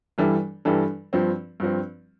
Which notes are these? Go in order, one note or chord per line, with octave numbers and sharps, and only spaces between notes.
G2 E3 G3 D4 A4
G2 E3 G3 D4 A4
G2 F3 C4
G2 F3 C4